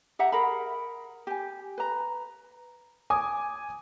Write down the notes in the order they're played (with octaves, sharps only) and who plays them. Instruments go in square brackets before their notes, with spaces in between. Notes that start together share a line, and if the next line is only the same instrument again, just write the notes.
[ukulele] G4 E5 F#5 A#5
G#4 A#4 A#5 B5
G4 G#5
B4 A#5
[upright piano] G#5 D6 D#6